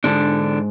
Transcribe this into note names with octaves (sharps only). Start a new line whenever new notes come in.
G#2 D3 D4